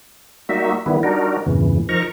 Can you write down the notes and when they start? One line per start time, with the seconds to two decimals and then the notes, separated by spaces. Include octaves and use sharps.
0.49 G3 A#3 D#4 F#4 E5
0.86 D#3 G3 B3 E4
1.03 G3 D4 D#4 F#4 A#4
1.46 E2 G2 A#2 C#3 E3
1.89 F3 D#4 A#4 A#5 C#6